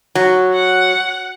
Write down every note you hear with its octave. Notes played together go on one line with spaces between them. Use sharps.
F#3
F#5